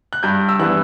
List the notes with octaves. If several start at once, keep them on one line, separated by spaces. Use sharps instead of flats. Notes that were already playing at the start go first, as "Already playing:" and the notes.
F#6
G2 G6
E6
E3 G3 B3 D4 F#6